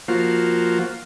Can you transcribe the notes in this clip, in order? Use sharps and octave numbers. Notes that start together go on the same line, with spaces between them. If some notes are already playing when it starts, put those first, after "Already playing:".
F3 A#3 F4 F#4 C5